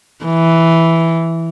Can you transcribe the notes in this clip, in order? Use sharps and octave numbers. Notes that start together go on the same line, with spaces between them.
E3